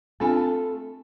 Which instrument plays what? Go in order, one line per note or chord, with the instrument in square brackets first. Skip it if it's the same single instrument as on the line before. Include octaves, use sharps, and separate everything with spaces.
[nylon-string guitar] A3 F4 A4 [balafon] C4 D4 G#5